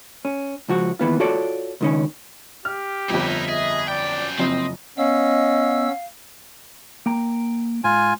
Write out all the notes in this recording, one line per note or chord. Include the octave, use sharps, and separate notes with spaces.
C#4
C#2 F3 F#4
D#2 E3 B3 F4
F4 F#4 A4 C#5 D5
C#2 D#3 C#4
G4 F6
G1 F2 D#4 E4 E5
G#4 D#5
F#2 D5 G5
F#1 F2 C4 D#5
B3 C#4 D#5 F5 E6
A#3 G5 A#5
G#2 F4 G#5